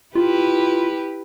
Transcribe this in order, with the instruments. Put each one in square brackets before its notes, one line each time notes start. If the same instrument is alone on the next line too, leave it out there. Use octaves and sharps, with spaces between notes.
[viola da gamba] E4 G4 B4 [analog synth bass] F4